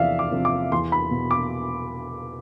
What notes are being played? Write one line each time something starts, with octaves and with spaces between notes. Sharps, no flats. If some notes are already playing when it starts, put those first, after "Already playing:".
Already playing: E2 C3 F3 D5 E5 F5
D6
C3 F3
D6
E2 C6
B5
B2
D6